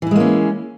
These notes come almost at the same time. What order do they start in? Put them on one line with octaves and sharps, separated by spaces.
E3 E4 G#3 A#3 C#4